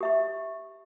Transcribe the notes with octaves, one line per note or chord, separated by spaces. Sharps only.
G4 E5 C#6